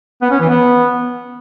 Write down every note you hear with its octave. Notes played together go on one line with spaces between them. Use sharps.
B3
C#4
E3
B3